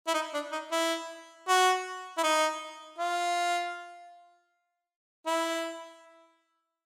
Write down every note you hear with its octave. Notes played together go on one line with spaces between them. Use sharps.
E4
D#4
D4
D#4
E4
F#4
E4
D#4
F4
E4